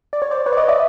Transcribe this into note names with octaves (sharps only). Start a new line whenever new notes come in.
D5
C#5
C5 D5
B4 C#5
D5
C#5 D#5
D5 E5